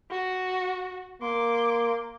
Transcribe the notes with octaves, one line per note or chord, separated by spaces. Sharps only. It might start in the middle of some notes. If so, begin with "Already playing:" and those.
F#4
A#3 C6 D6